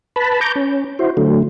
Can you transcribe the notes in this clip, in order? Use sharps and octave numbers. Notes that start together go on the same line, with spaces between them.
B4 A5 B5
A#5 C#6 D6 G6
C#4
E4 F#4 C5
D3 F#3 A3